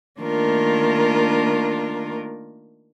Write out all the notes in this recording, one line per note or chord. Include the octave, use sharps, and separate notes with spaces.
D#3 A3 A#3 D4 F4 A#4